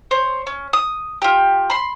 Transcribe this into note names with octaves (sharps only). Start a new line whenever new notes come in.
C5 C#5
C#4
D#6
F4 G4
B5 C6